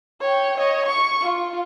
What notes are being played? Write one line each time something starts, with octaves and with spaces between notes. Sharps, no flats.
C#5 G5
C#5 D#5
C#6
F4